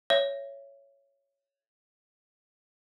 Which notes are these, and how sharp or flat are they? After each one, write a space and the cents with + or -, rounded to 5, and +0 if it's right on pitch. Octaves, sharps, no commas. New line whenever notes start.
C#5 +0 E5 +25